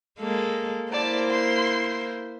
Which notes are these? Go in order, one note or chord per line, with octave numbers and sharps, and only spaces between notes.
G#3 A#3 A4
A#3 E4 C5 D5 A5
C6